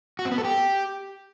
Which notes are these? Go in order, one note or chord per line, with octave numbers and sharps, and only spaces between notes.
F#4
C4
B3
A4
G4